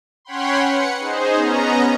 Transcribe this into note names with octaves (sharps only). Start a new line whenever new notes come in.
C#4 C#5 F#5 G5 B5 C6
B4 F#5 C#7
D#4 G#4 C5
B3 C#4 D#5 A#5